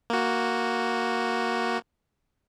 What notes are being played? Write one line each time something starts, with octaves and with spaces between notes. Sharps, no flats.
A#3 F#4